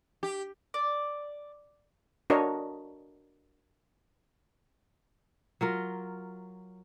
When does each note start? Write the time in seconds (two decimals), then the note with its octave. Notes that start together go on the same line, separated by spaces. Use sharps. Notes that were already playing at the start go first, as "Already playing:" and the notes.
0.23 G4
0.74 D5
2.30 D4 F#4 A#4 C#5 D#5
5.61 F#3 F4 A#4